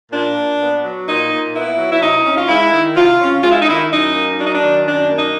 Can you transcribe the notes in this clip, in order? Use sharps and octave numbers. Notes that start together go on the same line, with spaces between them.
A#2 D4
A#2
B3
F#3
A#2 D#4
A#2
B3 E4
F#3
E4
C3 D#4
C#4
F4
G#3 E4
D#3
C3 F4
C#4
G#3 F4
E4
D#4
D#3 E4
F#2 D#4
A#3
F#3 D4
D#4
D4
D#3
F#2 D4
A#3
D#4